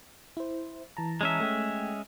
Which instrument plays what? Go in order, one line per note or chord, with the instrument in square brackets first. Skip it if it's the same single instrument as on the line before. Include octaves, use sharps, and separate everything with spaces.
[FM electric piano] E4 C5
E3 A5 A#5
[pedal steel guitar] G#3 C#4 E5
[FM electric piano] A3 G5